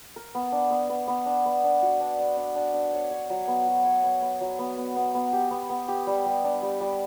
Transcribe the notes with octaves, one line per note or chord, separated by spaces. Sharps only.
A#4
B3
D4
B3
B3
B3
D4
B3
D4
F#4
D4
D4
D4
D4
D4
C#5
C#5
F#3
B3
F#4
C#5
B3
B3
F#3
B3
B3
B3
B3
G4
B3
B3
G4
G3
G3
D4
G3
G3